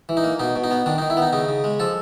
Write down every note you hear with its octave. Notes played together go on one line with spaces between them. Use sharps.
E3
D#4
A#3
B2 D#4
B2
D#4
B3
D#3 D4
D#4
D#3
E4
B3 D#4
C#3 D#4
C#3
G#3
F3 A4